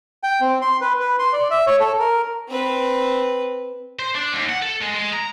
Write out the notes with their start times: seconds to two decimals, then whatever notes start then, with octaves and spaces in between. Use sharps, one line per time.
0.23 G5
0.41 C4
0.62 C6
0.81 B4
1.00 B4
1.19 C6
1.33 D5
1.51 E5
1.67 C#5
1.80 A4
1.99 A#4
2.49 C4 B4
3.99 C5
4.15 D4
4.33 D#2
4.50 F#5
4.62 A4
4.82 G#3
4.95 G#3
5.14 A#5